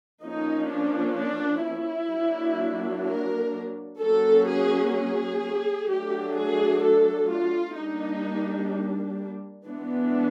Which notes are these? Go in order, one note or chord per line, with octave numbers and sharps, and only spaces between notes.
F3 A#3 C#4 D#4
D4
D4
E4
F#3 A#3 D4
A#4
F#3 A#3 C#4 A4
G#4
G#4
F#3 A3 D4 G4
G#4
A4
F4
G3 A#3 D4 D#4
E3 G#3 B3 D4